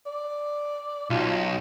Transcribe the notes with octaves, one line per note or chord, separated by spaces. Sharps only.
D5
B1 F4